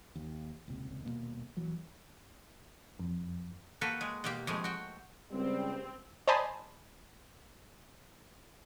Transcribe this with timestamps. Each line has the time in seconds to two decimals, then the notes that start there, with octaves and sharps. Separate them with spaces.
0.15 D#2
0.68 D#1 C#2 C3
1.05 D#1 F2 B2 A#3
1.57 D#1 E3 F#3
3.00 F2
3.81 A#3 F#4 A4 B4 G5
4.01 G#3
4.24 B2 A#3 G4
4.47 F2 G#3 A3
4.64 F#4 G5
5.32 C#2 G3 C4
6.28 C5 D5 D#5 G#5 A5 B5